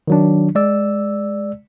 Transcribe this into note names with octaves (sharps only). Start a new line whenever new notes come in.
D#3 F#3 D4
G#3 D5 E6